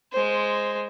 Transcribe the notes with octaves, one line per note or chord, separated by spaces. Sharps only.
G#3 C5